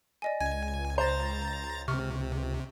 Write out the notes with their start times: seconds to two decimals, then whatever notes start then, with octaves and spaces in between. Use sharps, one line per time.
0.22 D5 D#5 G#5
0.41 C#2 G#5 G#6
0.98 C5 A#5 A6
1.88 C3 C#6 F6